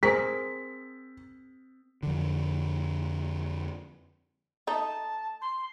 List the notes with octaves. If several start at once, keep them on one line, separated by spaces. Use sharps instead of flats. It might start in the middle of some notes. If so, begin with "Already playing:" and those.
C4 G#4 A#4 B6
F2 D3
A3 D#4 A5
C6